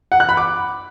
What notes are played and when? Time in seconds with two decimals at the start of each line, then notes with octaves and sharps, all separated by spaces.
0.12 F#5
0.20 F#6
0.29 B5
0.37 D6